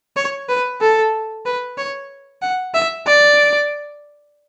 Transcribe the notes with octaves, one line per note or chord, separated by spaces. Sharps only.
C#5
B4
A4
B4
C#5
F#5
E5
D5